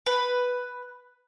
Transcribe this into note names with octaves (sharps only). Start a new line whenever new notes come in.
B4